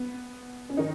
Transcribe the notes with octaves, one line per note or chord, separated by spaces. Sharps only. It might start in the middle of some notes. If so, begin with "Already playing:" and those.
Already playing: B3
C#4
D#3 D#4